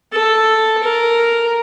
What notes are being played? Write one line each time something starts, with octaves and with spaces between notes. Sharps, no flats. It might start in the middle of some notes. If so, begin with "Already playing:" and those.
A4
A#4